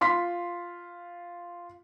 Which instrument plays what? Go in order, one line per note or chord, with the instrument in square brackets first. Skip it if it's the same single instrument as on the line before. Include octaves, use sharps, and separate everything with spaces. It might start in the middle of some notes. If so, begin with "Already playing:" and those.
[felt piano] F4 C6 B6